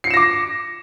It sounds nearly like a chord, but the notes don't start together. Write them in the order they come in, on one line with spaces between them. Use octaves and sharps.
C7 C#7 E7 A#6 D6